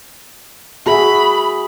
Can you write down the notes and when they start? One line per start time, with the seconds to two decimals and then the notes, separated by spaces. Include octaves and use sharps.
0.86 F#4 G#4 E5 B5